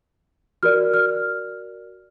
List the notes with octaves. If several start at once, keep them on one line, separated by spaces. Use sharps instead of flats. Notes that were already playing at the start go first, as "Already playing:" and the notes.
F#4 A#4 D5 F6
F6